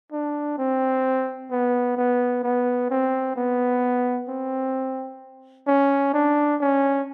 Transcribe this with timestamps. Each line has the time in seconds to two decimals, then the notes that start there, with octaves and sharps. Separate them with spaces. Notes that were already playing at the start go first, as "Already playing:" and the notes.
0.12 D4
0.58 C4
1.51 B3
1.97 B3
2.43 B3
2.90 C4
3.36 B3
4.29 C4
5.67 C#4
6.14 D4
6.61 C#4